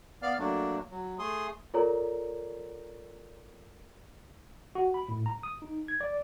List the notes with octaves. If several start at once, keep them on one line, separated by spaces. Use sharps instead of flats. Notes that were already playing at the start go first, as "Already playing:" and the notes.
B3 D5 F5 F6
F#3 A3 A#3 D4
F#3
A3 G#4 C6 D#6
F4 A4 A#4 C#5 D5 A#5
F#4
B5
A2
A#5
D#6
D#4
G#6
D5